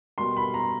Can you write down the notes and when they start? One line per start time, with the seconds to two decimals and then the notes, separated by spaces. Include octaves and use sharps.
0.18 B2 G3 A#3 C6
0.37 B5
0.54 A#5